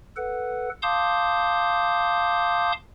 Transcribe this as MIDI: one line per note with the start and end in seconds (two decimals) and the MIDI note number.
0.16 0.69 69
0.16 0.69 71
0.16 0.69 78
0.82 2.72 77
0.82 2.72 81
0.82 2.72 84
0.82 2.72 86
0.82 2.72 87
0.82 2.72 91